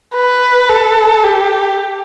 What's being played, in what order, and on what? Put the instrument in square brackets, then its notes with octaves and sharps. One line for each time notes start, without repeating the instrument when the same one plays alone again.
[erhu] B4
A4
G4